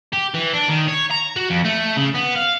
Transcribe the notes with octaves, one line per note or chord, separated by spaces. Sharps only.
G4
E3
D4
D#3
C#5
A#5
F#4
F2
A3
C#3
B3
F5